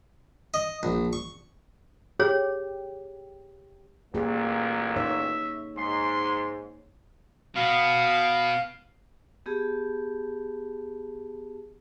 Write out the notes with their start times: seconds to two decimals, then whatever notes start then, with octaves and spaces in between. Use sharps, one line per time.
0.54 D#5
0.83 A#1
1.13 C#6
2.20 G4 G#4 C#5
4.14 A1 A#2 A#3 G4 G#4
4.96 D#4 C#5 E5
5.77 G#2 C6
7.56 B2 B3 F5
9.46 B3 G4 G#4 A5